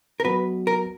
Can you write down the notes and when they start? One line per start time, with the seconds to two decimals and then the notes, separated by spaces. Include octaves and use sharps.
0.20 A#4
0.25 F#3 B3 F#4 B4
0.67 A#4